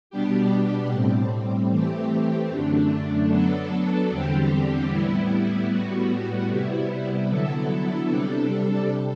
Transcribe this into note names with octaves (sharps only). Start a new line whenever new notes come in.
B2 G3 B3 D4 G4
A2 G3 C4
E3 A3 C4 G4
F#2 D3 A3 D4
F#3 B3 D4 A4
E2 D3 G3 C4 G4
A2 G3 B3 E4
A2 G3 B3 F#4
C3 G3 B3 E4
D3 F#3 B3 E4 A4
C3 G3 D4 A4